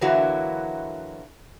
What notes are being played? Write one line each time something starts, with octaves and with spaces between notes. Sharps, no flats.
D3 E3 F#3 A#3 E4 F#4